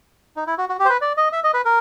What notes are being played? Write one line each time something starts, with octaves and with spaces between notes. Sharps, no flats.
D#4
E4
F#4
F#4
G4
C5
B4
D5
D#5
E5
D#5
B4
A#4